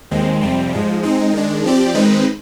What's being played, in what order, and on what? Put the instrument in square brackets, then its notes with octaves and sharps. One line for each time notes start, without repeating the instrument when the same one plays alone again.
[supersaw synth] D#2 D#3 G#3 C4
F2 C3 G3 C4
G#2 F3 G#3
G#3 C4 D#4
D#3 G#3 D4
F3 C4 G4 D5
D#3 G#3 C4 D#4 B4